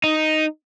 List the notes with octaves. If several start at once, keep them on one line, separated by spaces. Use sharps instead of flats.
D#4